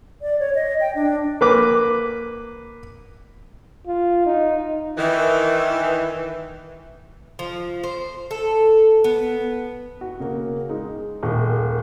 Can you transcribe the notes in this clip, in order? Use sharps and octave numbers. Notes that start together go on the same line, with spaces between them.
D5
C#5
D#5
G5
D4
A#3 B4 D6
F4
D#4
D#3 E3
F3
C5
A4
B3
F#4
C#3 A#3
G#3 D#4
D#1 A#2 G#3 A#3 C#6